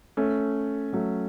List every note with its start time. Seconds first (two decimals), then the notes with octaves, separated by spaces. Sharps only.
0.17 A3 C#4
0.93 F#3 A3